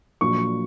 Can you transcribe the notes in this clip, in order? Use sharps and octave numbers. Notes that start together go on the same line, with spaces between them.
A#1 A#2 F#3 C#6